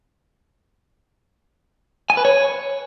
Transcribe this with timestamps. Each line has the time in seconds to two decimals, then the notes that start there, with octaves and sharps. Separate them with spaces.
2.10 G#5
2.17 B4
2.25 C#5